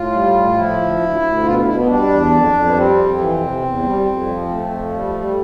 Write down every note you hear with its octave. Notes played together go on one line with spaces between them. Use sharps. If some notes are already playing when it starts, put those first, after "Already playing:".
Already playing: A2 F4
G3
A2
F3 E4
D2
D2
D2
B2 F4
B2 E4
B3
G3 D4
E2
F2
F2
B3
G3 C4
F2
E3
C3
E2
G3
F2
F3
F2 A3
F3
G3
G3